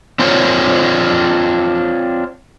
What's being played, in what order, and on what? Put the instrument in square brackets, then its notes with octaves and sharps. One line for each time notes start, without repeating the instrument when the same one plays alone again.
[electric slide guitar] C4 D4 F4 C5 C#5